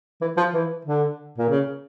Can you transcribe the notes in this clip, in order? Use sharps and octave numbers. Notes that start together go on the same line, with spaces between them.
E3
F3
E3
D3
A#2
C#3